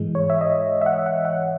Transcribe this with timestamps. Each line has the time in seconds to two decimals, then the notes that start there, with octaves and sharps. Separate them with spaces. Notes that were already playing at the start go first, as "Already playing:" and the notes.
Already playing: G#2 E3 G#3
0.15 C#5
0.30 E5
0.41 D#5
0.82 E5
0.86 F#5
1.06 F#5
1.25 F#5